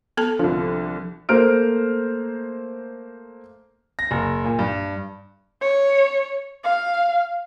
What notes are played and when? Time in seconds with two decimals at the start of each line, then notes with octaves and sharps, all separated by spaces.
0.17 B3 A4 A5
0.39 C2 D3 F3
1.29 A3 A#3 C5 A#5 F6 D7
3.99 A#6
4.11 F#1
4.44 A#2
4.59 G2
5.62 C#5
6.64 F5